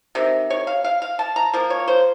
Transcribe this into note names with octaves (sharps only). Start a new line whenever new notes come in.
C3 D#3
C#5
F5
F5
F5
A5
A#5
F3 A#3
C#5
C5